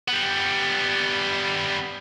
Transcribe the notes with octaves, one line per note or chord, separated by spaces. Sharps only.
G3 B3